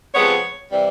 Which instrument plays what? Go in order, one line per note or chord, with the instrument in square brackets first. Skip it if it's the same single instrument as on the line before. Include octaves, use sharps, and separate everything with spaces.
[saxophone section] C3 F3 G#3 B3 [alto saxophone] C#5
[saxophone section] C3 E3 G3